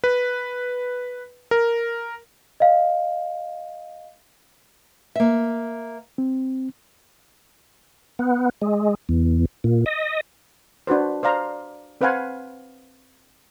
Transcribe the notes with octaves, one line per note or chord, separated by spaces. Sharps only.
B4
A#4
D#5 F5
A#3 E5
C4
B3
G#3
E2
A#2
D#5
D4 F#4 B4 C5
C5 D5 F5 A#5
C4 B4 C5 F5 F#5 G#5